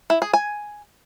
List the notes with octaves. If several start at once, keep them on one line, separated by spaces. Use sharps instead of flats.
E4
G#4
G#5